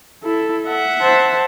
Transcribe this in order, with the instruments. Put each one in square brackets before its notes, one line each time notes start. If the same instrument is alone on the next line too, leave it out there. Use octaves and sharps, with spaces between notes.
[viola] E4 [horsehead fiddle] A4
[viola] E5 F#5
[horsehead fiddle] C5 A5